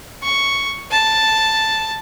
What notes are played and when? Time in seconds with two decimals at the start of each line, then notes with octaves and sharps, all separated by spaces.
0.23 C#6
0.91 A5